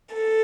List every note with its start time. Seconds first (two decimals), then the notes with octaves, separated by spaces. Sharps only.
0.14 A4